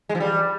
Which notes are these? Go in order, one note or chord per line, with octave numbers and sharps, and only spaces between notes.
G#3
F3
G3